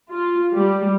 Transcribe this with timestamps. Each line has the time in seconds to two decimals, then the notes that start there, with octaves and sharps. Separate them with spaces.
0.10 F4
0.52 G3